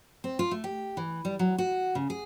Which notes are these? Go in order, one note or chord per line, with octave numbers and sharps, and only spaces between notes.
C4
F4
A3
G4
E3
G3
F#3
F#4
C#3
G#4